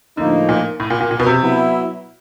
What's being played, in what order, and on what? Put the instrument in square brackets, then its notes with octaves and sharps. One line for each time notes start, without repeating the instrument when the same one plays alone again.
[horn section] A2 F3 A#3 D#4 [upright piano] D3
[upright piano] A#2
A2
A#2
A#2
A#2
B2
C3
[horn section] F#3 B3 E4